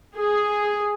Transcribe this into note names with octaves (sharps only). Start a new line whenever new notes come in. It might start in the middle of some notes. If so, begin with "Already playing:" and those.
G#4